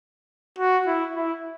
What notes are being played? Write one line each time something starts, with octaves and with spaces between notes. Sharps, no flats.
F#4
E4
E4